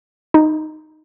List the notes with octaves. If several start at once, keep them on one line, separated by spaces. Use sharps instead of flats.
D#4